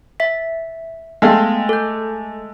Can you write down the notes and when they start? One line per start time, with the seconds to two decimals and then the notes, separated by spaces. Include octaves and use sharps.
0.20 E5 B6
1.22 G#3 A3 B3 F5 G5
1.69 A4 G6